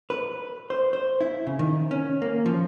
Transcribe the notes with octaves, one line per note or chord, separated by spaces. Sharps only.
B4
C5
C5
E4
C#3
D#3
C#4
A#3
F3